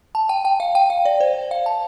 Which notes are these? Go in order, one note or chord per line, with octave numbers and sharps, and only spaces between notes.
A5
G5
G5
F5
G5
F5
D5
C5
F5
A5